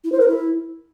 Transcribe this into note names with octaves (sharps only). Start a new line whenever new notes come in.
E4
C5
A#4
E4